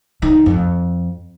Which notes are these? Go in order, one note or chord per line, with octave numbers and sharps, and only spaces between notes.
D#3
F2